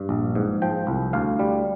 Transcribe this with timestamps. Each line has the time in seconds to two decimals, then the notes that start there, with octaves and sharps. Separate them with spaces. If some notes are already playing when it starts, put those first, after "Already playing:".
Already playing: G2
0.09 A#1
0.35 G#2
0.62 F3 G5
0.87 C2
1.13 D2 F5
1.39 G3